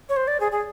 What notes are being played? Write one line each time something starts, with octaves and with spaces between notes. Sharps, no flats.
C#5
C5
D5
G#4
G#4